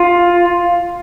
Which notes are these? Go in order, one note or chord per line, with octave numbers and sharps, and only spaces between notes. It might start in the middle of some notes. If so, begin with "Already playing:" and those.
Already playing: F4